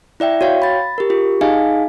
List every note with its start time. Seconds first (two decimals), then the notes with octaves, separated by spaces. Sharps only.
0.20 E4 D5 E5 G5
0.41 F#4 C#5 F5 G5
0.62 B5 A6
0.98 G4 A#4
1.10 F4 G4
1.41 D#4 G#4 D#5 F5 G#5